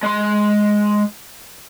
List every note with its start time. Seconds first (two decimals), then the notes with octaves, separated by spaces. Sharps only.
0.03 G#3 C6